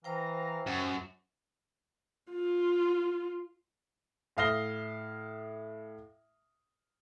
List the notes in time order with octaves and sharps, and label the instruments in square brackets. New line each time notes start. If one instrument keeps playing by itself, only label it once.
[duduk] E3 [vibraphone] C5 G5 [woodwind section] F5 A#5
[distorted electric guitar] F#2
[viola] F4
[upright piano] A2 E5 F5 D#6 A#6 G7